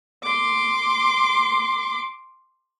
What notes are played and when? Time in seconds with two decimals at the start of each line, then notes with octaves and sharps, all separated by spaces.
0.24 C6 D6